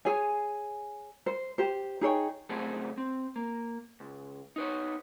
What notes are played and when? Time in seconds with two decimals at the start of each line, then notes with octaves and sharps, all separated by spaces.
0.05 G#4 C#5 G#5
1.26 C5
1.58 G4 C5
2.01 D#4 G#4 C#5 G5
2.49 C#2 F#3 A3 C4 G#4 A4
2.98 C4
3.36 A#3
4.00 C#2
4.56 D#4 B4 C#5